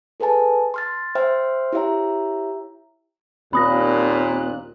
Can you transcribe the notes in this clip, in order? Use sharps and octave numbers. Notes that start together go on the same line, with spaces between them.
G#4 A4 B4 G#5 A5
C6 F6 A6
C5 E5 G5 C6 F6
E4 G4 C#5 E5 G5 A#5
D#2 A#2 C4 B5 D#6 F#6 A#6